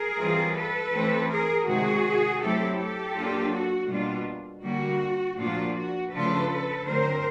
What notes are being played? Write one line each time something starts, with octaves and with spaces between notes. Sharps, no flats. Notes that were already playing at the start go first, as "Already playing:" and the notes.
Already playing: G#4 A#4
E3 G3 C4 F4
A4 B4
E3 A3 C4
G#4 A#4
C3 D#3 G#3 F#4 G#4
F#3 A3 C4 E4 G4 A4
G4 A4
F#3 A#3 D4 F4
F#4
B2 G3 A#3 D4 F4
D3 G3 A#3 F#4
A#2 F3 A#3 D4 F4 F#4
F#4
C#3 F3 A3 D4 F4 A4 B4
D3 F#3 A3 C4 A#4 C5